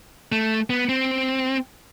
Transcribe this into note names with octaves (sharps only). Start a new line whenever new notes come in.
A3
B3
C4